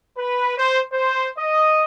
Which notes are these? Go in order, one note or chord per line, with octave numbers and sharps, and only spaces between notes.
B4
C5
C5
D#5